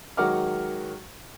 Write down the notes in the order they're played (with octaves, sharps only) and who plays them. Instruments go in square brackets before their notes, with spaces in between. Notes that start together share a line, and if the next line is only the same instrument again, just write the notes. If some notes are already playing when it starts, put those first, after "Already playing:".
[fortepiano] D#3 F#3 G#3 F#5 D6 F6